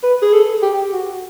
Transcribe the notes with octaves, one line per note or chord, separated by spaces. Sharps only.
B4
G#4
A4
G4
F#4